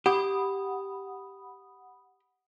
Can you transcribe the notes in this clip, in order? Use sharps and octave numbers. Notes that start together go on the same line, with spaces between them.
G4 F#5 B5 D#6